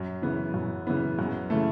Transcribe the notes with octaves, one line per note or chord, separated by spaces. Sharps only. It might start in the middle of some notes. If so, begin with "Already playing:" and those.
Already playing: F#2
C#3 E3 B3
F#2
C#3 E3 B3
F#2
C#3 E3 A3